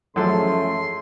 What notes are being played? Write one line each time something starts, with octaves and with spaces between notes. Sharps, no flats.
F#2 C#3 E3 F3 G#3 A3 A4 C6